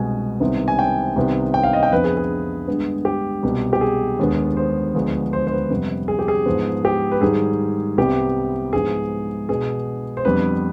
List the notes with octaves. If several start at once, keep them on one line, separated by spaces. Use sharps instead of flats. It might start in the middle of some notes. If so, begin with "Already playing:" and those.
Already playing: C2 B2 G#3 B3 G#5
C2 C3 D#3 B3
G#5
G5
C2 C3 D#3 B3
G5
F5
D#5
G5
F2 D3 F3 B3 B4
G#4
G#4
G2 D3 G#3 B3
G4
C2 B2 B3
G4
G#4
D#2 D3 G#3 B3
C5
D2 D3 F3 G#3 B3
C5
C5
B4
F2 C3 G3 B3
G#4
G4
G#4
G#2 F3 B3
G4
B4
G#2 D#3 G3 G#4
C2 C3 G3 B3 G4
G#2 F3 G#3 B3 G#4
B2 B3 G#4
C5
F2 D3 G3 B3 B4